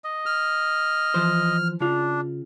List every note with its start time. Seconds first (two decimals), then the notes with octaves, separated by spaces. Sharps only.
0.04 D#5
0.26 F6
1.14 E3 F3 C5
1.80 C#3 D4 F4